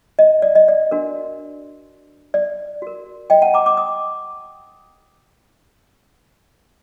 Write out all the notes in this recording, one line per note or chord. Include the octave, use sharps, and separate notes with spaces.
D#5
D5
D#5
D5
D4 F#4 A#4
D5
F#4 A#4
D#5 G5
F#5 A5
A#5 D6
D6
D#6